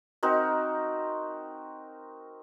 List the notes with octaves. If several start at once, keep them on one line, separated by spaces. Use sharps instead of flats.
C4 D#4 F#4 A#4